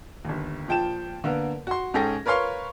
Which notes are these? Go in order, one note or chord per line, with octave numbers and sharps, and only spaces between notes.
G1 D#2
A#2 F3 G5 A5 E7
D3 A#3 B3 A#4
F#4 C6
G#2 C#4 G#4 A4 G5 A#6
A#4 B4 C#5 F5 C6 C#6